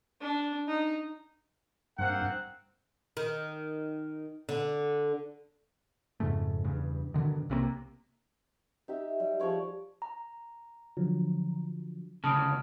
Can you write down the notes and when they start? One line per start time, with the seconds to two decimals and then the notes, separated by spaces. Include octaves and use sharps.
0.21 D4
0.68 D#4
1.98 G2 A#3 C4 F#5
3.17 D#3
4.49 D3
6.20 F2 G#2 C#3 A3
6.64 E2 G2 C#3
7.14 G2 B2 D3 D#3
7.49 C2 C3 G3 A#3
8.88 D#4 G4 E5
9.20 G3
9.40 F3 G#4 C#5 D5
10.02 A#5
10.97 D3 F3 F#3
12.24 D2 C#3 A5 D#6 F6 D7